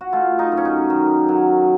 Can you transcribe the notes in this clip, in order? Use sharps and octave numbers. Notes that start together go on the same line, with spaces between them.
F#4
A3 F4
D#4
F#2
C#4
D#4
D#3
F#3